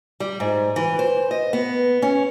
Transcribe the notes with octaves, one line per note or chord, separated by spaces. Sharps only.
G3
G#2
E3
C5
D#5
B3
C#4